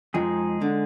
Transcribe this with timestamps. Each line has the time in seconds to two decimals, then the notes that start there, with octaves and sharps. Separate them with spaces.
0.14 F2 F3 G#3 D#4 G#4
0.62 D3